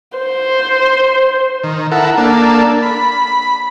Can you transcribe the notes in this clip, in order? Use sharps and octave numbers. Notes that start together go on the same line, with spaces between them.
C5
D#3
E4 A4 A#4 F#5
A#3 D4 A4
B5